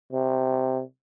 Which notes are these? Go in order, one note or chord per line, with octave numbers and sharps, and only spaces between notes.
C3